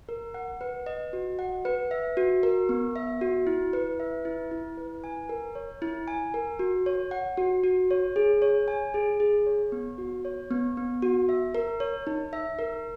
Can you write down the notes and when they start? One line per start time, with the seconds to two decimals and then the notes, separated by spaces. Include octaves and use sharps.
0.09 A#4
0.34 F#5
0.61 B4
0.86 D#5
1.13 F#4
1.39 F#5
1.65 B4
1.91 E5
2.17 F#4
2.43 A#4
2.69 B3
2.96 E5
3.21 F#4
3.47 E4
3.73 B4
3.99 E5
4.25 E4
4.51 E4
4.77 B4
5.04 G#5
5.29 A#4
5.55 C#5
5.82 E4
6.08 G#5
6.34 A#4
6.59 F#4
6.86 C#5
7.11 F#5
7.37 F#4
7.64 F#4
7.91 C#5
8.16 G#4
8.42 C#5
8.68 G#5
8.94 G#4
9.20 G#4
9.46 C#5
9.72 B3
9.98 F#4
10.25 C#5
10.51 B3
10.77 B3
11.02 F#4
11.29 E5
11.55 A#4
11.80 C#5
12.07 D#4
12.33 E5
12.59 A#4